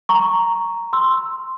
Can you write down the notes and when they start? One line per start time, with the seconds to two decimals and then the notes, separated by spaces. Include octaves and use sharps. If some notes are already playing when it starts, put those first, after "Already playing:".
0.09 A#5 C#6
0.93 C6 E6